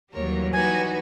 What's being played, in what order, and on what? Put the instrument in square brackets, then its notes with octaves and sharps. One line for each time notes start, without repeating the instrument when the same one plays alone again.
[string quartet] D#2 A#4 C#5 [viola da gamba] E3 F#3 G3
[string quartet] D#4 F#4 B4 [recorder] G#5